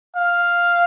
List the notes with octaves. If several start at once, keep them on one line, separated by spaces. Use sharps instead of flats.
F5